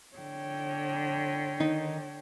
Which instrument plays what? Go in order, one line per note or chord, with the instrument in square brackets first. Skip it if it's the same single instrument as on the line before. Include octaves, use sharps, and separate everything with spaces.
[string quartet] D3 [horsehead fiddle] C#5 G5
[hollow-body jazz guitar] D#3 D#4